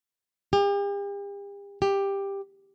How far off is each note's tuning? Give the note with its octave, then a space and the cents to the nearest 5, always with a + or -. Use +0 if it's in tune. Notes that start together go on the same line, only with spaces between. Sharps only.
G4 +40
G4 +10